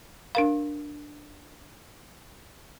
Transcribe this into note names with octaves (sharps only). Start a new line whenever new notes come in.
D4 A#4 F5